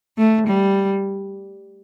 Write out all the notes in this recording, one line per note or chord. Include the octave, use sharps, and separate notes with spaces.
A3
G3